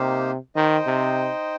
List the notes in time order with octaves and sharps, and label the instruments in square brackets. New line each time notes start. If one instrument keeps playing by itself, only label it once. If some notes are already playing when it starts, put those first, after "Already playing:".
Already playing: [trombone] C3 [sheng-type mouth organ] A#3 D#4 G4 C5 F5
[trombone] D#3 [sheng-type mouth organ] D#4 C5 D#5 G5
[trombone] C3